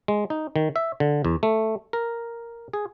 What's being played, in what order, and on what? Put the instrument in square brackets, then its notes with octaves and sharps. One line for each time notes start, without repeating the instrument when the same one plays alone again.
[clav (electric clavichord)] G#3
D#4
D#3
E5
D3
E2
A3
A#4
G#4